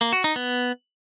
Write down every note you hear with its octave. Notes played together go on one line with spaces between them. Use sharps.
A#3
F#4
D#4
B3